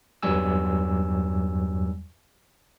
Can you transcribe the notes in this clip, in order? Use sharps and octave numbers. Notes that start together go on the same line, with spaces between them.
E2 G2 F#3 G3 G#5 E6